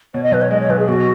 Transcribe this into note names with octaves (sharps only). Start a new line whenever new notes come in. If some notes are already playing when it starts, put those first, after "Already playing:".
B2 C#5
D#5
B1 B4
C#5
G#3 D#5
C#5
B1 B4
G#4
B2 F#4